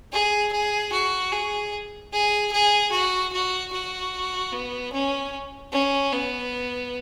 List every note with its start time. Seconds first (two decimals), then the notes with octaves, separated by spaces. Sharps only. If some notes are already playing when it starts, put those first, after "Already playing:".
0.12 G#4
0.52 G#4
0.92 F#4
1.32 G#4
2.13 G#4
2.52 G#4
2.92 F#4
3.33 F#4
3.72 F#4
4.53 B3
4.93 C#4
5.72 C#4
6.12 B3